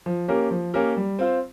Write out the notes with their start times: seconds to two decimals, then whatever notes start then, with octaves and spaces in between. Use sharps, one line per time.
0.06 F3
0.28 A#3 C#4 G4 A#4
0.51 F3
0.74 A#3 C#4 G4 A#4
0.97 G3
1.19 C4 F4 C5